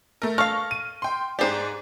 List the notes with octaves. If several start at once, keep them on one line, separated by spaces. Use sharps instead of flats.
A3 A#4
A4 F5 C#6 F6 A#6
D#7
G5 C6
G#2 G4 G#4 C5 D5